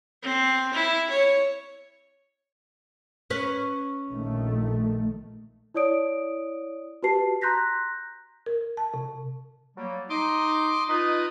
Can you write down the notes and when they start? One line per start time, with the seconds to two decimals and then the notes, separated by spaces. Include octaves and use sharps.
0.22 C4
0.73 E4
1.10 C#5
3.30 C#4 B4
4.10 A#1 D#3 A3
5.74 E4 C#5 D5 D#6 D7
7.03 F#4 G4 B4 A5 C7
7.42 A#5 C6 F#6 G6 A#6 B6
8.46 A#4
8.77 A5
8.94 C3
9.77 F#3 G3 A#3
10.10 D#4 D#5 C6 D6
10.89 D#4 F4 B4 D#5 D#6